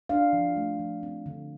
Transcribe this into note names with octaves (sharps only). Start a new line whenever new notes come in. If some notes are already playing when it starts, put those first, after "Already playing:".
D4 F5
F3
A3
F3
C4
D3